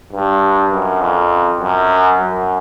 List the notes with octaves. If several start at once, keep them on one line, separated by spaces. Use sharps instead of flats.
G2
F#2
F2
F#2
F#2